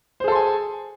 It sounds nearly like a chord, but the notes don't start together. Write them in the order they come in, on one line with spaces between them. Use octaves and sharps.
C5 G#4 A4 C6 G#5